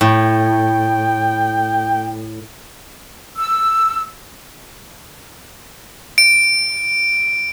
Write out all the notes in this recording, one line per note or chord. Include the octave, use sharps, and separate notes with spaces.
A2 G5
E6
D7